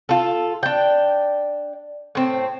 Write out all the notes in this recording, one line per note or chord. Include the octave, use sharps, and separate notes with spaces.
F4 A4
D4 G5
A2 C4